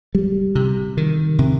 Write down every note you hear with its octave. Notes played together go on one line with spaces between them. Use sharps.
G3
C3
D#3
C3